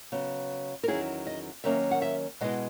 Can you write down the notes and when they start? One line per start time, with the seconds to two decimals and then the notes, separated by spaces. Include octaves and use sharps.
0.12 C#3 F#3 B3
0.83 A#4
0.88 E2 D#3 F#3 C#4 E4 G#4
1.27 D#5
1.64 D#3 F#3 A#3 C#4 E5
1.91 F#5
2.02 E5
2.41 B2 G#3 B3 E4 D#5